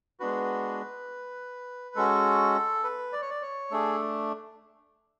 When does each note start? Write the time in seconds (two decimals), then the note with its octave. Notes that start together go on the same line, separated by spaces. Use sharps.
0.20 G#3 B3 D4 F#4 B4
1.96 G#3 C#4 F#4 A4
2.84 B4
3.13 D5
3.22 C#5
3.30 D5
3.42 C#5
3.71 A3 D4 G#4 A4